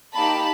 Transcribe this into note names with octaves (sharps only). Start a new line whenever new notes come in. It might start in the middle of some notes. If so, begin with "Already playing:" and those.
A#3 D#4 G4 A5 B5